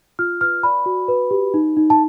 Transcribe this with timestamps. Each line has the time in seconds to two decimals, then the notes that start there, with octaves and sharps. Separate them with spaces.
0.19 F4 F6
0.41 B4 F6
0.63 D5 B5
0.86 F#4
1.08 B4
1.31 G4
1.54 D#4
1.77 D#4
1.90 A5